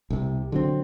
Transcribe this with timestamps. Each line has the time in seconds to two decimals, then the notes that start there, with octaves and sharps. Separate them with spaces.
0.10 C2 C3
0.52 D3 F#3 C4